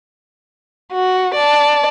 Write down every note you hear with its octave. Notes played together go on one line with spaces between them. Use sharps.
F#4
D5 A5